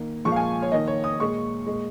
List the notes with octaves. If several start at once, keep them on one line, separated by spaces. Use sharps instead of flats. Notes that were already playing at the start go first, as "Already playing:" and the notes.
Already playing: D#3 A#3
A#2 F3 G#3 C#6
F5
G#5
C#5
D#3 A#3 D#5
C#5
D#6
A#2 G#3 C#6
A#2 G#3